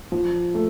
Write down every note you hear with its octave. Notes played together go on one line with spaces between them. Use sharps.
F3
A3